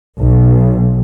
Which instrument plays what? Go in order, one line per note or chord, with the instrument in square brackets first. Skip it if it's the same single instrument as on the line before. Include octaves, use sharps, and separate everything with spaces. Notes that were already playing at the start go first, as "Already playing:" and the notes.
[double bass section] B1